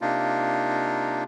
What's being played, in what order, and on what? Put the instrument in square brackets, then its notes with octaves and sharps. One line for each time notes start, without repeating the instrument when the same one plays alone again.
[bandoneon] C3 A#3 D4 D#4 F4